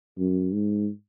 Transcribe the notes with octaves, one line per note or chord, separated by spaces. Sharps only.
F#2
G#2